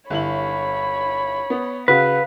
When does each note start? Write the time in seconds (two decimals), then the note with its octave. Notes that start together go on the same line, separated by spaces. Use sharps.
0.10 G1 E4 C#5 B5 F#7
1.50 B3
1.88 C#3 F#4 B4 F5